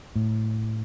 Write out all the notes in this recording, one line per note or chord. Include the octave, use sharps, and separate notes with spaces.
A2